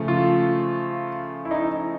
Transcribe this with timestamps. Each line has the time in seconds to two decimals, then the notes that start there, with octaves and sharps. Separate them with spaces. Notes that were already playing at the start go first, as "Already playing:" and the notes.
Already playing: C#3 F3 A3
0.08 F4
1.45 E4
1.51 D#4